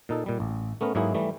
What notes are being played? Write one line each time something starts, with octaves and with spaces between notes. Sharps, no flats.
A#2 D#4 A4
A#2 G3
A1
A3 B3 C#4 A#4
G#2 F#3 A#3 E4 G#4
E3 G3 A3